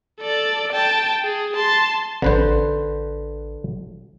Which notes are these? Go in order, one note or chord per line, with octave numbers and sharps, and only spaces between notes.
A4 D5
G5 A5
G#4
A5 C6
A1 D3 B4 C5